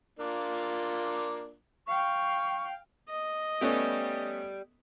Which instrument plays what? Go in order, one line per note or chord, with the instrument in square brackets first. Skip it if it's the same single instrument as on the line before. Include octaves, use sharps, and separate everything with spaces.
[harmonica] A#3 D4 F4
[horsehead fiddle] F5 G5 [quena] C#6
[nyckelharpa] D#5
[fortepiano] A3 B3 C#4 [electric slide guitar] G4 D5